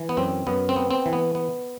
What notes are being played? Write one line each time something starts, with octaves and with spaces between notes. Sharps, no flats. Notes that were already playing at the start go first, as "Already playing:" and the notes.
Already playing: E3
B3
F#2 C4
F#2 B3
C4
B3
C4
E3
B3
B3